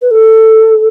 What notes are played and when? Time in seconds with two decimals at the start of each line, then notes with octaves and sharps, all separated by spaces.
0.02 B4
0.11 A4